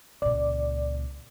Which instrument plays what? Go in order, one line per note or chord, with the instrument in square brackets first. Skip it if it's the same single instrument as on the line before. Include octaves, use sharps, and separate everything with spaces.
[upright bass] C#2 A#2 [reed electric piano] D5